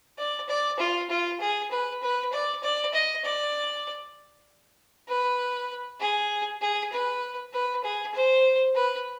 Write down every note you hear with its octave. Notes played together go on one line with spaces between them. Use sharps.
D5
D5
F4
F4
G#4
B4
B4
D5
D5
D#5
D5
B4
G#4
G#4
B4
B4
G#4
C5
B4